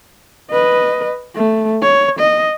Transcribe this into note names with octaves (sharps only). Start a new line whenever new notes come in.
B4 D#5
A3
C#5
D#5